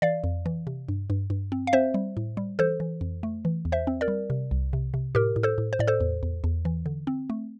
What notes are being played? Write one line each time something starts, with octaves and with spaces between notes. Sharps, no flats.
E3 D5 F5
F2
E3
C3
G2
G2
G2
C4
F5
C4 C5 E5
G3
A2
G3
E3 A4 C5
E3
F2
A3
E3
E2
C5 E5
C4
A#4 D5
G3
C3
C2
C3
C3
A2 G4 A#4
A2
A4 C5
A2
C5
A2 D5
A4 C5
E2
E2
E2
E3
D3
C4
A3